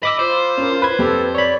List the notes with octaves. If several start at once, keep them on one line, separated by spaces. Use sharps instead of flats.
D#5 B5 D6 E6
F4 C5
C#4 A#4
B4 B5 G#6
F2 G4 A4
C#5 D5 B5